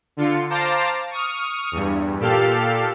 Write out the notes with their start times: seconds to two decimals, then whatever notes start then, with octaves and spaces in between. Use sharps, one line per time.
0.17 D3 F4 C#7
0.50 C5 F5 A5 A#5 D6
1.10 C#6 D#6 F6
1.72 E2 G2
2.19 A#2 G4 A4 F5 F6